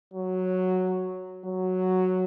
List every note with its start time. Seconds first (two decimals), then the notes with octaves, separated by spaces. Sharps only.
0.13 F#3
1.45 F#3